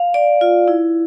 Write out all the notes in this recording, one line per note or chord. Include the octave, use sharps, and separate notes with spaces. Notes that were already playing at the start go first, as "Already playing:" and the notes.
Already playing: F5
D5
F4
E4